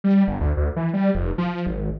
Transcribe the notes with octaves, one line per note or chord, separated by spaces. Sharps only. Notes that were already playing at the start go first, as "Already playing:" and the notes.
G3
G1
D2
D2
E3
G3
F1
F3
G#1